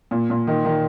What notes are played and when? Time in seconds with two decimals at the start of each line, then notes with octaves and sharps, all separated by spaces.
0.11 A#2
0.30 A#2
0.47 D#3
0.65 D#3